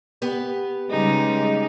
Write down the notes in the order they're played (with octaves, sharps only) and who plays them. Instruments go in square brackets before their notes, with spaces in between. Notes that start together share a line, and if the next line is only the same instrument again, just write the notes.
[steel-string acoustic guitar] B3 G4 B4
[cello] C#3 G3 [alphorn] G#3 [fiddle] D#4